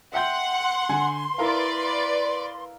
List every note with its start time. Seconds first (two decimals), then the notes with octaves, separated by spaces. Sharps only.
0.14 E5 F#5 G5 C6 G6
0.89 D3 G#5
1.38 E4 A#4 B4 D5 F5